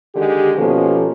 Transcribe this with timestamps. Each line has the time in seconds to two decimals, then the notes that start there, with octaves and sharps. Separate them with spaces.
0.15 D3 D#3 G#3 G4
0.57 B2 F3 A#3 C#4 G4 A4